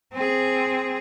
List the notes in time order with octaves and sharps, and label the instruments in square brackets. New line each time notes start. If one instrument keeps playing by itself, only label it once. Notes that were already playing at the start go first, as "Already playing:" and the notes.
[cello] C4 G#4